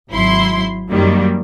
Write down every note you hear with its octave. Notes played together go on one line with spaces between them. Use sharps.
G#1 F#3 E4 C6
F#2 D#3 F#3 G3 A#3